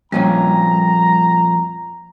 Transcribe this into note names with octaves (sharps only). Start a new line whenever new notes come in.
F2 A#2 G3 C#4 A#5